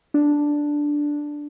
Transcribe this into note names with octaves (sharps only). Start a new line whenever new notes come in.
D4